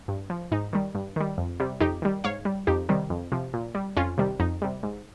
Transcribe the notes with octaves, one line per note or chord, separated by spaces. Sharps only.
G2
F3
G#2 D#4
D#3 G3
G2
D#3 G3
F2
C3 G3
F2 D#4 G4
D#3 G3
G#2 C#5 F5
G3
F2 D#4 G4
C3 D#3 G3
F2
C3 F3
A#2
G3
F2 C#4 F4
C3 D#3 G3
F2 D#4
C3 G3
G#2